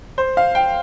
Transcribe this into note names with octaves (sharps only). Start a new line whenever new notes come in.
C5
F5
G5